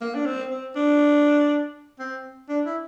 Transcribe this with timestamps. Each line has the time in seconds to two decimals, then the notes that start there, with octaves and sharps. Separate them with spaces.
0.01 A#3
0.15 D4
0.26 C4
0.51 C4
0.76 D4
1.99 C4
2.49 D4
2.66 E4